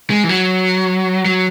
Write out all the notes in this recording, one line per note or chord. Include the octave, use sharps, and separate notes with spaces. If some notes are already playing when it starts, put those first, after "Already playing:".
G#3
E3
F#3
F#3